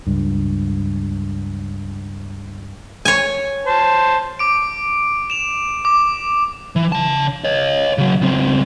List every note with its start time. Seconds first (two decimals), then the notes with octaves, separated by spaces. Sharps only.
0.07 C#2 G2
3.05 C#5 G#5
3.67 C5 A5
4.39 D6 D7
5.30 E7 F7
5.85 D6
6.76 E3
6.92 C#3 A5
7.44 C#5 D#5
7.98 C#3 F#3
8.21 C#2 C4